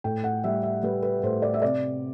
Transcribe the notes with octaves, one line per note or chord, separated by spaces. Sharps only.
A2 G5
F#5
G3 E5
E5
G3 B4
B4
A2 C5
D5
E5
C3 D5